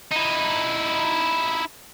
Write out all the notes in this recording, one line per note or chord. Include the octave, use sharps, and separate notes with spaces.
D#4 E4